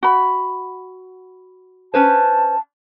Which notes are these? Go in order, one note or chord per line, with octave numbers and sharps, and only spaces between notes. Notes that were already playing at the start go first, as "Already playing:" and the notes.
F#4 B5
C#4 B4 C5 A5